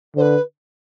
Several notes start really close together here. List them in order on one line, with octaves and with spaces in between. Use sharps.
D3 C5 B4